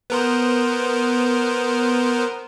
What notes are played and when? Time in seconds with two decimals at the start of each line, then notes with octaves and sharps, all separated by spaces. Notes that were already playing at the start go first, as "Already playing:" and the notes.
0.10 B3 A#4 C5